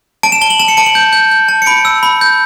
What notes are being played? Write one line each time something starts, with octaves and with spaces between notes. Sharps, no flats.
A5 D7
E7
A5 G7
F#7
A5 E7
C#7
A5 D7
F#7
G6
G6
G6
A5
C#7
B5 D7
E6
B5
G6